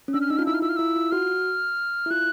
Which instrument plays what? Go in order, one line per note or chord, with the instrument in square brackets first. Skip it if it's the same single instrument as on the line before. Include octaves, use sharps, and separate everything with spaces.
[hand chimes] C#4
[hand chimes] D4 [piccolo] E6
[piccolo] F6
[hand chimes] D#4 [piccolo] E6
[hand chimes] F4 [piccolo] F6
[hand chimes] E4 [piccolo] E6
[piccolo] F6
[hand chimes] F4 [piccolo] E6
[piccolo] F6
[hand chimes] E4 [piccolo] E6
[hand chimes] F4
[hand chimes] F#4 [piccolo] F6
[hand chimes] E4
[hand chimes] F4 [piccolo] F#6